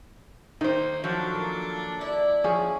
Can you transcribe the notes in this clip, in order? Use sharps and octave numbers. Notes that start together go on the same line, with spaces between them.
D#3 A3 A#3 D#4 C5 G5
F3 F#3 D4 A4
A#3
E4 D5
F3 C#4 G#4